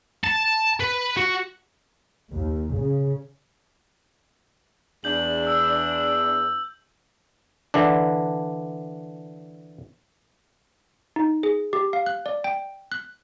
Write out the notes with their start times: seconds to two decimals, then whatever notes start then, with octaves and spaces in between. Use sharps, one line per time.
0.24 A5
0.80 B4
1.17 F#4
2.32 D#2
2.76 C#3
5.04 E2 D4 G6 F#7
5.47 E6
7.74 D3 E3 D4
11.16 D#4
11.43 G#4
11.73 G4
11.93 F5
12.06 F#6
12.26 D5
12.44 G5
12.92 F#6